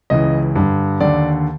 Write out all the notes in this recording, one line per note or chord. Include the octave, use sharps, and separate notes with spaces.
C#2 C#3 E3 D#5
G2 D3
D#2 D3 D5